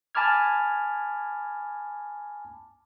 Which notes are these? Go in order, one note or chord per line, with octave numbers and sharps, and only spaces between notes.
G#5 A5 B5 D6 F6 G#6